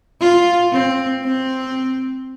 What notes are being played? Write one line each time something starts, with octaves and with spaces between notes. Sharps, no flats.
F4
C4
C4